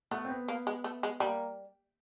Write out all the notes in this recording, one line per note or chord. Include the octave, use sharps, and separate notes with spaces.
A3 B3
C4
B3
A#3
G#3
A3
G#3
G3 A#3